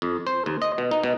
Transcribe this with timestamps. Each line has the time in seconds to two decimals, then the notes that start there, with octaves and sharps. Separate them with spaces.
0.02 F2
0.27 C5
0.46 D#2
0.62 D#5
0.78 B2
0.91 D#4
1.03 B2